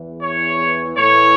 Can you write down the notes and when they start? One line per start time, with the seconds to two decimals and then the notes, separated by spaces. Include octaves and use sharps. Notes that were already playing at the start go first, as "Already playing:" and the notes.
Already playing: E2 E3
0.23 C#5
0.98 A2 E3 C#5